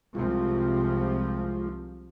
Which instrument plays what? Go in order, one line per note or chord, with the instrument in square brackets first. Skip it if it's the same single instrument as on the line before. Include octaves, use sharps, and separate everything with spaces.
[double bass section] C2 C3 F3 [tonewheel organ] G#3 F4